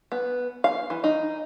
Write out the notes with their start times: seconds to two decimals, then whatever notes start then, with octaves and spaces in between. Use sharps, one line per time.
0.12 B3
0.64 F5
0.90 E3
1.04 D#4